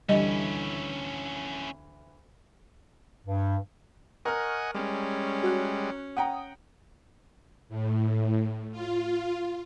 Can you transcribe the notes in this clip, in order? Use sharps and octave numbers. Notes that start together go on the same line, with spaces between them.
D2 D3 E3 G3 C#4 E4 D#5
G2
A#4 D#5 F#5 G#5 C#6 F6
G3 G#3 C#4
F#4 C#5 F#6
F#5 G5 A#5 D#6
A2
F4